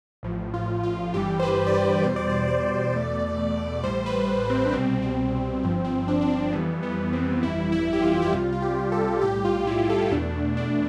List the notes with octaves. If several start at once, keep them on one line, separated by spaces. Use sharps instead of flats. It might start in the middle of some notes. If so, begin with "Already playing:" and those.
A1 A2 F3
F4
F4
G1 G2 E3 G3 G4
C5
B4
D5
C5
E2 B2 G3 C5
D5
C5
D5
E2 B2 A3
A1 A2 G3 C5
B4
C4
D4
C2 B2 G3 C4
C4
G1 G2 F3 C4
C4
D4
D4
C4
F2 E3 G3 B3
B3
C4
G1 F2 E3 G3 E4
E4
G4
F4
G4
C2 C3 G3 F4
F4
G4
A4
B1 A2 G3 G4
F4
E4
A4
E2 B2 A3 D4
D4